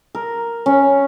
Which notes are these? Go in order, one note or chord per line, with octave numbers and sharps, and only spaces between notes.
A#4
C#4